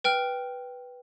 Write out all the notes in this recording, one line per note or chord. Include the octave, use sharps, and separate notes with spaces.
B4 G5 F6